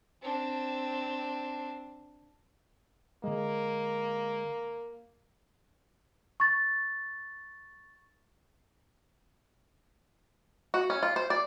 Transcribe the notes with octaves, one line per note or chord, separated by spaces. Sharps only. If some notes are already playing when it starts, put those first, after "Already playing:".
C4 D4
D3 G#3 A#3
C#6 A6
F#4
C#4
F4
C5
D5